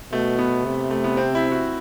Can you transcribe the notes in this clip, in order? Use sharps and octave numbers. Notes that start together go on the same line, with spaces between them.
B2 A3
B3
C3
A3
B3
C4
E4
F#4